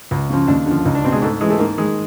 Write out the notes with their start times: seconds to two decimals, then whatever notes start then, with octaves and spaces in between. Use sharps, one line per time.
0.11 C#2
0.30 C#3 F3
0.47 D#2 D4
0.66 D3 F3
0.85 C#2 D#4
0.95 D4
1.04 B2 C4
1.12 G#3
1.22 G#2 A3
1.41 E3 G#3
1.50 A3
1.59 G#2 A#3
1.78 D#3 G#3